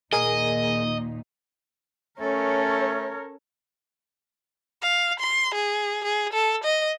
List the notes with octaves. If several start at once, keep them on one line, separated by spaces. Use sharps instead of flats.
D#2 A#2 D#4 G#4 A#4 D#5 G#5
A3 C#4 A4 A#4 C#5
F5
C6
G#4
G#4
A4
D#5